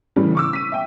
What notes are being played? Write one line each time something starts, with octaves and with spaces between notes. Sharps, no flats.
A2 C#3 E3 G3 A3
C#6 D6 E6
B6 D#7
E5 G5